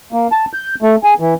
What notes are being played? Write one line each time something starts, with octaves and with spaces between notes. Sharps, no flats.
A#3
A5
G6
A3
G#4
E3